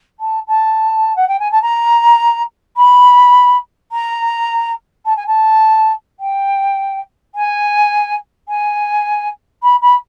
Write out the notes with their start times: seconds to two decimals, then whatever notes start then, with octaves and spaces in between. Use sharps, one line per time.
0.20 A5
0.48 A5
1.16 F#5
1.28 G5
1.39 G#5
1.52 A5
1.62 A#5
2.77 B5
3.92 A#5
5.05 A5
5.16 G#5
5.27 A5
6.20 G5
7.35 G#5
8.48 G#5
9.63 B5
9.82 B5